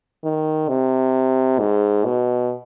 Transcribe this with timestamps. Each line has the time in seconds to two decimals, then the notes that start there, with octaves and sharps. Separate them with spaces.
0.24 D#3
0.69 C3
1.60 G#2
2.05 B2